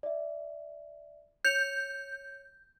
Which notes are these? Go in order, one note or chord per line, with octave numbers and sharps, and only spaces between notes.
D5 E5
C#5 G6 C#7 F7